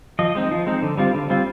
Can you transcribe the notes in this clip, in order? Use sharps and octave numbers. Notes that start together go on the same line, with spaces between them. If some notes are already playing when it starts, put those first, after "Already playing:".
F3 D#5
G#3 C4 D#4
F3
G#3 C4 D#4
D3
G3 C4 F4
D3
G3 C4 F4